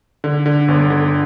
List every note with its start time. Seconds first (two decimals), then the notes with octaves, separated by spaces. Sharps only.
0.24 D3
0.46 D3
0.68 G1
0.90 D3